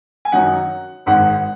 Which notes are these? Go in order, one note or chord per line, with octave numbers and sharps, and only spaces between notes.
G#5
F#2 D#3 F#3 D#4 F#5
G#1 G#2 D#3 F#5